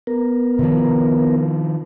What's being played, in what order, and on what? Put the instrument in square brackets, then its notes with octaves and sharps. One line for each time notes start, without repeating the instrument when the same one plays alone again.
[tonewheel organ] B3 A#4
[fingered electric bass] C3 D#3 F3